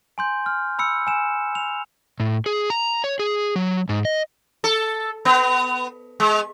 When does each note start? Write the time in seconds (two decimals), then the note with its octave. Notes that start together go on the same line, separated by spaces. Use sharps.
0.18 G#5 C6 G6
0.46 F6
0.79 B5 E6 C#7
1.07 G#5 E7
1.55 F7
2.20 A2
2.46 G#4
2.70 A#5
3.04 C#5
3.19 G#4
3.56 F#3
3.89 G#2
4.05 D#5
4.64 A4
5.25 B3
6.20 G#3